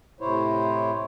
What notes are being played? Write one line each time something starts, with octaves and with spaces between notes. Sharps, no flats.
A2 C3 E4 C5 C#5